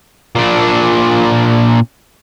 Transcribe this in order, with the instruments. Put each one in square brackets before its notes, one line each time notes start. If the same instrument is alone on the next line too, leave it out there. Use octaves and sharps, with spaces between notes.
[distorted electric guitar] A#2 D4